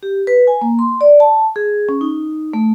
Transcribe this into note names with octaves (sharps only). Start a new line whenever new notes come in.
G4
B4
G#5
A#3
C6
D5
A5
G#4
C#4
D#4
A3